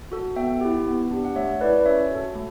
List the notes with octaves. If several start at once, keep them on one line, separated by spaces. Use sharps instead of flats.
F#4 A4
B3 E5 G5
E4 G4
B3
D4 G4
F#5
A3 C#5 E5
E4 A4 B4 D5
C#4 C#5 E5
F#4 A4
A3